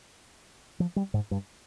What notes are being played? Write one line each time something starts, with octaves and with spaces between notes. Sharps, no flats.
F3
G3
G#2
G2